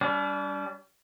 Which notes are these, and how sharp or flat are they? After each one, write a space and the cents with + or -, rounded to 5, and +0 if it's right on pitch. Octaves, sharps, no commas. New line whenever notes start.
G3 +0 D4 -45